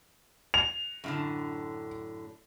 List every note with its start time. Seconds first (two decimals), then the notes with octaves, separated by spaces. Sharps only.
0.54 F7
1.04 F#2 A2 D3